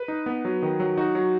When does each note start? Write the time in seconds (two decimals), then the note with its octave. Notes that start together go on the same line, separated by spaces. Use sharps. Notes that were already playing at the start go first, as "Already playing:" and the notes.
Already playing: B4
0.08 D#4
0.26 B3
0.45 F#3
0.62 D#3
0.80 F#3
0.97 D#4 F#4
1.15 F#3